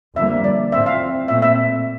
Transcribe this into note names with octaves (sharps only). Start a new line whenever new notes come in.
F2 D3 G3 A#3 E5
D5
A2 F3 C4 E5
F5
A#2 A3 C4 E5
E5